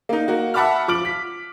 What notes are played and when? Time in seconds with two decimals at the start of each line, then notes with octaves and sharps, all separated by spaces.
0.09 A#3 D#4
0.28 A#3 F#4
0.54 E5 F#5 A5 B5 D6 F6
0.88 F3 D6 F6 D7 F#7
1.05 B6